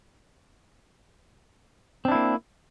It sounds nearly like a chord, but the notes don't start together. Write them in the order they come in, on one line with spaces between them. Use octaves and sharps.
C4 D4 E4 A#3